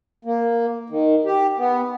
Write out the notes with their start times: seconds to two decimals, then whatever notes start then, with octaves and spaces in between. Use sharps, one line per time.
0.25 A#3
0.90 D#3
1.25 G4
1.58 B3